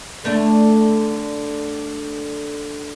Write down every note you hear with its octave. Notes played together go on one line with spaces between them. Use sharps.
D3 A3 D4